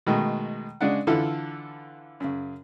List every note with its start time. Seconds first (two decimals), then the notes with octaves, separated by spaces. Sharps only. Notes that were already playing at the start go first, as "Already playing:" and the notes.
0.07 B2 D#3 G#3 A3
0.81 C#3 G#3 D4 D5 F#5
1.07 D3 E3 E4 F4 A4
2.20 F#2 C#3